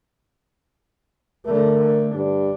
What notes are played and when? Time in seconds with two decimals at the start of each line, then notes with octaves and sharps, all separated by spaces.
1.46 D3 A3 A#4
2.15 G2 D4